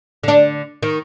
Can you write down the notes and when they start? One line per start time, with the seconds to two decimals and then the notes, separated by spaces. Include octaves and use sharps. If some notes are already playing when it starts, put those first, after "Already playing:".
0.23 D3 D4
0.83 D#3